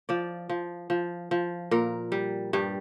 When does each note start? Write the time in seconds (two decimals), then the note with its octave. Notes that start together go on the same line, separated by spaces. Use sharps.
0.09 F3 D5
0.49 F3
0.90 F3
1.31 F3
1.71 A#2 A#4
2.12 G3
2.53 G2 G3